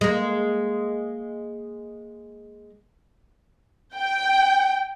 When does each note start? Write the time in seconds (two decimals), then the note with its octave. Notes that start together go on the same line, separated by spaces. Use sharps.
0.01 G#3 A#3
3.96 G5